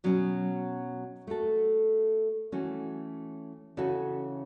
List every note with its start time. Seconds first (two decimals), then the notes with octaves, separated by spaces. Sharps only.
0.04 B2 F#3 C#4
1.27 A3 F#4 A4
2.52 E3 A3 C#4 F#4
3.77 C#3 E3 C#4 F#4 A4